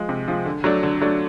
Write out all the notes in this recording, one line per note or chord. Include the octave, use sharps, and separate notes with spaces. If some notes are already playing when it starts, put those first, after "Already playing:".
Already playing: F3 G#3
C3
F3 G#3
D3
F#3 A3 D4
D3
F#3 A3 D4